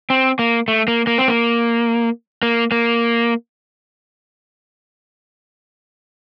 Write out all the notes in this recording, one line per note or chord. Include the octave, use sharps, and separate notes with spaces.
C4
A#3
A3
A#3
A#3
C4
A#3
A#3
A#3